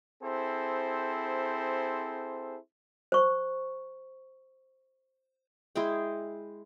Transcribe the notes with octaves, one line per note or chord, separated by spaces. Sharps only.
C4 E4 G#4 A4 C5
C5 C#6
G#3 E4 G#4 G5